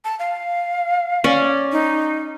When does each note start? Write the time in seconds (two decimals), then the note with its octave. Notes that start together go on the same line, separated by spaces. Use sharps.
0.05 A5
0.19 F5
1.24 C#4 D5
1.72 D#4